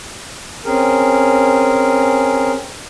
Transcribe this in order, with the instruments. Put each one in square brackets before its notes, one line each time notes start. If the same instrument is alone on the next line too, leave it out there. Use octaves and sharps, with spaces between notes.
[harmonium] C4 C#4 G#4 A#4